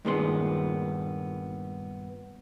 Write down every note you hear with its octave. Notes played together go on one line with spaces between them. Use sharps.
G2 A#2 D#3 G#3 B3 C6